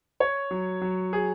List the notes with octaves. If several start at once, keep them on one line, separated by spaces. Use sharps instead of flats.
C#5
F#3
F#3
G#4